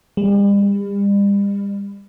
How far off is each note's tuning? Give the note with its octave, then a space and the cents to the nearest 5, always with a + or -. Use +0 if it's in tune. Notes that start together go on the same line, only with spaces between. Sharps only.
G3 +40